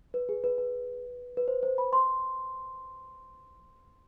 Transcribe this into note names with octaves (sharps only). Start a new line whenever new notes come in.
B4
G#4
B4
B4
B4
C5
C5
B5
C6